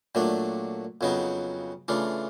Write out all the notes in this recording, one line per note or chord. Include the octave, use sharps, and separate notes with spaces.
A#2 F#3 A3 D4
F2 C#3 F#3 B3 D#4
C#3 E3 A3 D4 F4